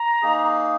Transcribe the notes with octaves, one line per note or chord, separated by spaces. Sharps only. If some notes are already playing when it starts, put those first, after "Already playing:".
Already playing: A#5
A#3 D#4 G#4